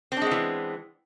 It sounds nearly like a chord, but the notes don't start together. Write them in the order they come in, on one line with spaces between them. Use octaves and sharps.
C4 D4 G#3 B3 E3